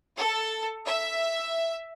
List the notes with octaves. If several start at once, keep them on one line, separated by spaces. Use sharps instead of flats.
A4
E5